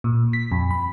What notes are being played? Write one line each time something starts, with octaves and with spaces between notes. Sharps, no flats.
A#2
B6
F2
B5